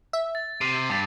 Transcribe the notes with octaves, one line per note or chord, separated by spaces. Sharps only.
E5
A6
C3 C7
G2 D6 A6